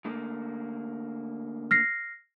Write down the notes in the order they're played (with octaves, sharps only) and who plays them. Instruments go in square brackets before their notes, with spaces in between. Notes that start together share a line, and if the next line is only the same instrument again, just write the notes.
[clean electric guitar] D3 A3 A#3
[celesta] F6 A#6 C7